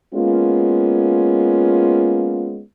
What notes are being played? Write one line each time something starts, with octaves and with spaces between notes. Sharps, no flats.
G#3 A#3 B3 C#4 F4